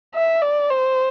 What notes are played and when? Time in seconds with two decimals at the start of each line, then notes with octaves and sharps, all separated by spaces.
0.15 E5
0.42 D5
0.70 C5